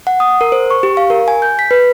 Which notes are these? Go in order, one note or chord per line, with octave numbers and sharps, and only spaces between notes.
F#5
D#6
A#4
C5
C#6
G4
F5
A#4
G#5
G6
B6
B4